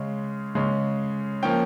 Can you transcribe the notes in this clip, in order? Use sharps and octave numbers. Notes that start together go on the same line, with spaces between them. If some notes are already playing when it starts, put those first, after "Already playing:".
Already playing: C#3 G#3 C#4
C#3 G#3 C#4
F3 A#3 C#4 G5